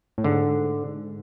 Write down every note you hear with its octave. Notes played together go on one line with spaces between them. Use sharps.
A2
G#2 D3